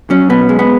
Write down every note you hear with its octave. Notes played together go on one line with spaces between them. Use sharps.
F#3 C#4
B2 B3
G#3
B3